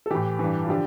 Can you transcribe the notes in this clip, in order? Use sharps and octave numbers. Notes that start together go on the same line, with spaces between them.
A4
A2 E3 G4
G2 E3
F4
D3 F3 G4